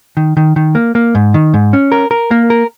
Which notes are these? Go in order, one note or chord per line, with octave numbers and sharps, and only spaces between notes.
D#3
D#3
D#3
A#3
A#3
G#2
D#3
G#2
C#4
A#4
A#4
A#3
A#4